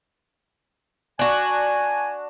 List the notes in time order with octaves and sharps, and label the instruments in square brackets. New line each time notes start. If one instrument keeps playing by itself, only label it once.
[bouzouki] D4 F#4 [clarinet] G#5